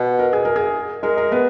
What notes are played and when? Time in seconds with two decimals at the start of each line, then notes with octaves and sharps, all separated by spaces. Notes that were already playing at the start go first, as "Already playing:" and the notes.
Already playing: B2
0.19 A#4
0.33 G#4
0.45 A#4
0.56 G#4
1.03 G#3 A#4
1.17 A#4
1.32 B3 B4